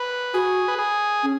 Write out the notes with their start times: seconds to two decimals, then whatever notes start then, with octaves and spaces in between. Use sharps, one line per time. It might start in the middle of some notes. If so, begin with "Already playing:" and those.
Already playing: B4
0.34 F#4 G#4
0.68 B4
0.79 G#4
1.23 C#4